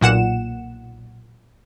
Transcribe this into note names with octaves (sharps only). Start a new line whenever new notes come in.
B1 A#2 F#5 E7